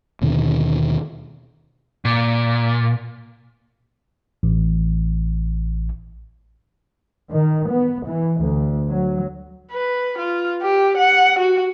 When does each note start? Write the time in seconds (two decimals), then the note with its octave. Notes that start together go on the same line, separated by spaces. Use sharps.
0.22 D#2 B2 D3 D#3
2.05 A#2
4.43 A1
7.31 D#3
7.70 B3
8.06 E3
8.42 D2
8.88 F#3
9.72 B4
10.18 F4
10.62 G4
10.97 F#5
11.39 F#4